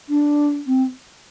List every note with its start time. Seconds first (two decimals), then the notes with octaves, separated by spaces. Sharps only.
0.09 D4
0.67 C4